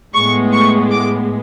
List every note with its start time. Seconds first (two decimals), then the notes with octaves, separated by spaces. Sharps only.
0.14 A2 G#3 B3 C#6
0.53 C#6
0.91 D6